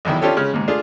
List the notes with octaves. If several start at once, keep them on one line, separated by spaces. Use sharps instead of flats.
B1 E2 D#3 E4
C#4 D4 F4 G4 A4 C#5
C#3 G#3 C#4 F6
D#2 G#2
A3 D4 F4 G#4